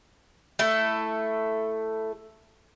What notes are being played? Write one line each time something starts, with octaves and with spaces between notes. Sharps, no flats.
A3 E4 A4